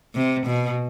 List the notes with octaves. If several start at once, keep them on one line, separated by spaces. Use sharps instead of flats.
C3
B2